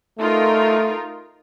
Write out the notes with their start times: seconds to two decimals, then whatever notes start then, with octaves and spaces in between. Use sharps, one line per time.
0.19 A3 D#4 F4 A#4